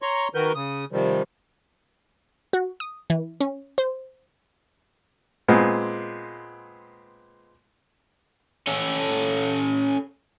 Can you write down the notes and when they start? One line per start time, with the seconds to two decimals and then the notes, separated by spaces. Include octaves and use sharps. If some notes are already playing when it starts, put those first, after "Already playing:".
0.02 C#5 A#5 C6 C#6
0.34 D#3 F#4 A#4 B4 G6
0.55 C#3 D#6
0.92 C3 D#3 F3 G3
2.53 F#4
2.80 D#6
3.10 E3
3.41 C#4
3.78 C5
5.48 A#2 G#3 B3 C4
8.67 C#4 A4